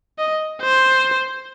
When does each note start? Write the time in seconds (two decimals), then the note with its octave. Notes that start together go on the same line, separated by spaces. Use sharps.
0.18 D#5
0.62 C5